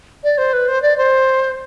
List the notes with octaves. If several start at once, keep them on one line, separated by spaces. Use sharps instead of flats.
D5
C5
B4
C5
D5
C5